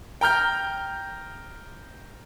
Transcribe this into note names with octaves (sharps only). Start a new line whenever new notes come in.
G5 A#5 F6 G6